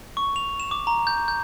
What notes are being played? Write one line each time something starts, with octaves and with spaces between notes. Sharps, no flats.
C#6
F7
E7
D6
A#5
G6
G6